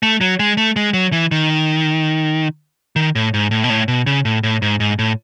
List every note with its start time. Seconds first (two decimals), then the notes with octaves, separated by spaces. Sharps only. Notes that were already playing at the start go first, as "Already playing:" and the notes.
0.03 A3
0.21 F#3
0.39 G#3
0.57 A3
0.76 G#3
0.93 F#3
1.12 E3
1.31 D#3
2.96 D#3
3.15 A2
3.34 G#2
3.51 A2
3.64 B2
3.70 A2
3.88 B2
4.06 C#3
4.25 A2
4.43 A2
4.62 G#2
4.80 G#2
4.99 A2